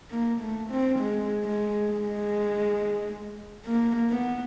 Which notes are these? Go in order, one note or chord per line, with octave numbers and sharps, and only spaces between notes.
A#3
A3
C4
G#3
G#3
G#3
A#3
B3